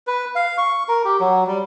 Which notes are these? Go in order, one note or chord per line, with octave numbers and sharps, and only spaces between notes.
B4
F5
C#6
A#4
G4
F#3
G3